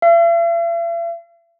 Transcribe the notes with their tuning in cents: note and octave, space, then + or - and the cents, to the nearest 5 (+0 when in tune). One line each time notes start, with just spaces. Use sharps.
E5 +45